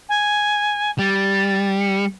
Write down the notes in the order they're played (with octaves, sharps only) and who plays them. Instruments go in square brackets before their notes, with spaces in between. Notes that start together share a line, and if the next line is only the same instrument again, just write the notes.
[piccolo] G#5
[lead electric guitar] G3 [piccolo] A6
[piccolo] C#7